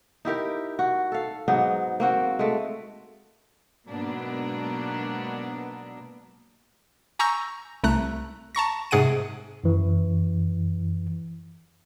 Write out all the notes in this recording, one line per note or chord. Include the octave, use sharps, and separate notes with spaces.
D#4 E4 G4 A#4
F#4
A4 F5
G#2 F#3 B3 D#4
A#3 C4 F#4
G#3 A3
G#2 B2 F#3 A#3 B3 D4
G#5 A#5 C#6 E6 G6 A#6
C2 A3 A#5 F#6
A5 A#5 C#6 A#6
G#2 C3 G#4 F#5 D7 D#7
F#2 E3